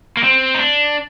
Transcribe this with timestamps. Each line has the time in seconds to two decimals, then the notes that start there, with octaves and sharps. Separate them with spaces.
0.17 A#3
0.23 C4
0.54 D#4
0.59 D4